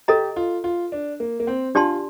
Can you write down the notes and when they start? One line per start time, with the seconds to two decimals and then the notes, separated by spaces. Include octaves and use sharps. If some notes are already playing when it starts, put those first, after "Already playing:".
0.08 G4 A4 D#5 A#5
0.36 F4
0.64 F4
0.92 D4
1.20 A#3
1.40 A#3
1.47 C4
1.75 D4 F4 G4 D5 A5 C6